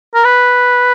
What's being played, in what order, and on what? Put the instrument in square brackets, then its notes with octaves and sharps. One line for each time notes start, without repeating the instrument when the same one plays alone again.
[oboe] A#4
B4